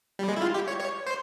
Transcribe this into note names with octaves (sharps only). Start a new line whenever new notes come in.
G3
G#3
E4
F4
G4
C#5
C#5
C5